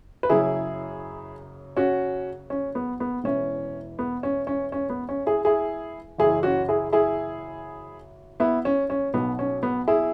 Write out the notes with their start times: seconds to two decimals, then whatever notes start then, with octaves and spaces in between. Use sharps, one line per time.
0.23 B4
0.30 F#1 F#2 C#3 E4 G#4
1.77 C#4 F#4
2.50 C#4
2.75 B3
3.00 B3
3.24 E1 E2 E3 C#4
3.99 B3
4.23 C#4
4.47 C#4
4.72 C#4
4.90 B3
5.09 C#4
5.26 E4 G#4
5.45 E4 G#4
6.18 F#1 F#2 E3 E4 G#4
6.43 C#4 F#4
6.69 E4 G#4
6.93 E4 G#4
8.40 B3 E4
8.65 C#4
8.90 C#4
9.14 B1 B2 B3
9.39 C#4
9.63 B3
9.88 E4 G#4